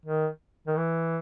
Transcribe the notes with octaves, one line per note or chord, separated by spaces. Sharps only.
D#3
D#3
E3